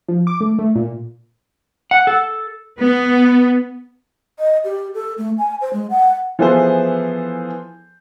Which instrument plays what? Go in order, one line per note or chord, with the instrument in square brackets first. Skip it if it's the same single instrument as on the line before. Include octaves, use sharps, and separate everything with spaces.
[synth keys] F3
D6
A3
A3
A#2
[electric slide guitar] F#5
A4
[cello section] B3
[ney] D#5
G4
A4
A3
G#5
C5
G#3
F#5
[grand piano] E3 F3 B3 G#4 A4 C5